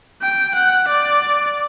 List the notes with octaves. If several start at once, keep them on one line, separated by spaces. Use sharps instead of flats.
G5
F#5
D5